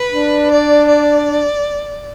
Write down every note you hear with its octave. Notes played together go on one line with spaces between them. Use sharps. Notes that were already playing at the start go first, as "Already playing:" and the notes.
Already playing: B4
D4
D5
D5